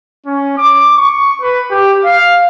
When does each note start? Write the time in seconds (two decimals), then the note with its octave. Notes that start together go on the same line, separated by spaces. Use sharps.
0.26 C#4
0.58 D6
0.97 C#6
1.41 B4
1.71 G4
2.04 F5